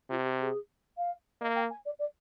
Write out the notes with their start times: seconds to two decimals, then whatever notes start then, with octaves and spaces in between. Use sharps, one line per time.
0.10 C3 F4
0.25 G4
0.40 G#4
0.98 F5
1.41 A#3 D#5
1.55 G5
1.70 G#5
1.85 D5
1.99 D5